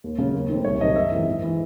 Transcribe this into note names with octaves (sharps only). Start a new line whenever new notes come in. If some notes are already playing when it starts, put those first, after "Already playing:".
D#2
C#3 F#3
D#2
D#3 A3 C4
C2 C#5
C3 D#3 F#3 D#5
F#2 E5
E3 G#3 C4
G#2
E3 G#3